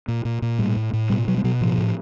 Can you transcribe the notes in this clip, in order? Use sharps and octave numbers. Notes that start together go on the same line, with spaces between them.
A#2
A#2
A#2
A2 G3
A2
A2
B2 G3
B2 F#3
G3
B2 F#3
A2 F3
A2